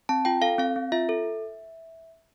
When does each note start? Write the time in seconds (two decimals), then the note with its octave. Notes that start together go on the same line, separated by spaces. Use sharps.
0.09 C4 A5
0.25 F4 G5
0.42 A4 F5
0.58 C4 F5
0.76 C4
0.92 F4 E5
1.09 A4